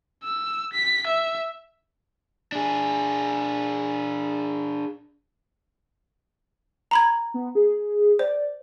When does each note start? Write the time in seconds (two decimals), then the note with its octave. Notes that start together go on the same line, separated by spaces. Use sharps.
0.24 E6
0.73 B6
1.07 E5
2.52 D4 G#4
6.91 A#5 B5 G#6
7.34 B3
7.55 G#4
8.19 C5 D5